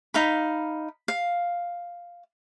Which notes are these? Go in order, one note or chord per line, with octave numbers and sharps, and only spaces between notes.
D#4 F5 B5
F5